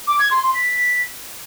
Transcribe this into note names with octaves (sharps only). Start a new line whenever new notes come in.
D6
G#6
C6
C6
B6